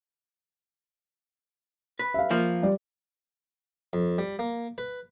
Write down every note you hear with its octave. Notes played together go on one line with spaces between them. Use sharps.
B4
E5 F5
F3 A#3
G3 D5
F2
G3
A#3
B4